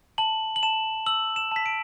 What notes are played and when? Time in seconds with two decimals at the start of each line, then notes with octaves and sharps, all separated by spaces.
0.18 A5 F#7
0.56 F#7
0.63 A5 E7
1.06 E6 F#7
1.36 E7
1.51 A5 B6
1.66 D7